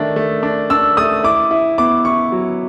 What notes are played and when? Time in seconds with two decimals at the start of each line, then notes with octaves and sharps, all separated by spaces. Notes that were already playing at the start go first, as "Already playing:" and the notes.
Already playing: D#3 A3 D4
0.16 A3
0.43 D4
0.70 D4 E6
0.97 A3 D#6
1.24 E4 D6
1.51 E4
1.78 B3 D6
2.05 E4 C#6
2.32 F#3